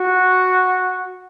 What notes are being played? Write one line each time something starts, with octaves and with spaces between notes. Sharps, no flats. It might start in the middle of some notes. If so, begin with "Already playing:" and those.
Already playing: F#4